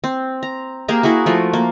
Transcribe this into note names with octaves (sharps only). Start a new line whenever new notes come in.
C4
A#5
A#3 G4 G#4 A#5
A#3 E4 F#4 G#4
F3 A3 F#4
A#3